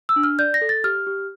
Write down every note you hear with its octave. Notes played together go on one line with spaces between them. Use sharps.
E6
D4
F6
D5 G6
A#6
A4
A6
G4 F6
G4